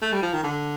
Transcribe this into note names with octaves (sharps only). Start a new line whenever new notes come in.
A3
G3
F3
D#3
D3